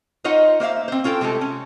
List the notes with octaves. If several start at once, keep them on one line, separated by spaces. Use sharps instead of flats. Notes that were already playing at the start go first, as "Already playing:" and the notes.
D#4 F4 C5 C#5 D#5 F#5
A#3 C5 E5 F5
C4 C5
C#4 F4 A4 G5
C3 G#3 A3 A4
C#4